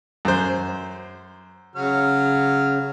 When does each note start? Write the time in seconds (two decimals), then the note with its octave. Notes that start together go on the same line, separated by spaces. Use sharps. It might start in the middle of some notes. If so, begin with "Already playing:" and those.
0.25 F#2 C5
1.75 C#3 F#3 F#4 F6